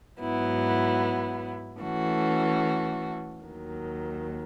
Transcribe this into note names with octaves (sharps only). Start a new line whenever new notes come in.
G#2 F#3 B3 E4
E3 A3 C#4 F#4 A4
D#2 D#3 F#3